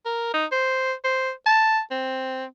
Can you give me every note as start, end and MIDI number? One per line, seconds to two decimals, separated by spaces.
0.05 0.29 70
0.34 0.46 63
0.52 0.93 72
1.04 1.31 72
1.46 1.80 81
1.91 2.45 60